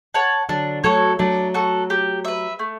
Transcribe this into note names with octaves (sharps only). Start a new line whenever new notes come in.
C#5 F#5 A5
D3 F#3 D4
F#3 A3 F#4 A4 C#5
F#3 A3 D4
F#4 A4
G4
B4 E5
A3